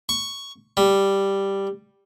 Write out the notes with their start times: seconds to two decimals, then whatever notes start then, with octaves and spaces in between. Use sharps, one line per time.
0.09 C#6
0.77 G3